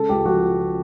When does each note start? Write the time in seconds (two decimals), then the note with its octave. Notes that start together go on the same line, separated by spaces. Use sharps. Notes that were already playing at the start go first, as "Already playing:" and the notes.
Already playing: C#3 G#3 A4
0.09 C#2 G4
0.25 F3 F#4